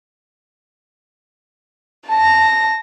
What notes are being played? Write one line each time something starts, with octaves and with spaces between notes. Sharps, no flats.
A5 A#6